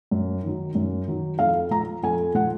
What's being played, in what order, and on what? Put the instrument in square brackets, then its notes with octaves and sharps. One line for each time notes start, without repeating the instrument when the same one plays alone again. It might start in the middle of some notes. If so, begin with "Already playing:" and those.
[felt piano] F#2
D#3 F#3
F#2
D#3 F#3
F2 F5
F3 A#5
F2 G#5
F3 F#5